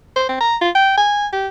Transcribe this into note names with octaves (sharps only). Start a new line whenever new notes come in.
C5
C4
A#5
F4
G5
G#5
G4